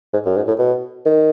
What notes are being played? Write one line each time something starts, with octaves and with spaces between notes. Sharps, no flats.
G#2
F#2
G#2
A2
B2
D#3